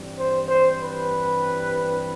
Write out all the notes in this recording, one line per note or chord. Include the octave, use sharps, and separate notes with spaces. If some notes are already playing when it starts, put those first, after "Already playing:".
Already playing: G2 E3 G3 C4
C5
C5
B4